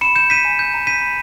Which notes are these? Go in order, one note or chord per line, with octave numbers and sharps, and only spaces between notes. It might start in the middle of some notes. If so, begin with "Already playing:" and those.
B5 C#7 E7
G6 C#7 E7
G6 B6 D#7
G#5
G6
A#5
G6 B6 D#7
B5